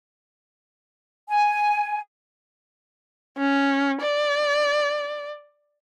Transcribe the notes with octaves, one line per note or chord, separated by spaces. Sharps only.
G#5
C#4
D5